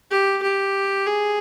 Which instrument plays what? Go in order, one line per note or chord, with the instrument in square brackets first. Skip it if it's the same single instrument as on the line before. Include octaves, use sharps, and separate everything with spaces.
[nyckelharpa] G4
G4
G#4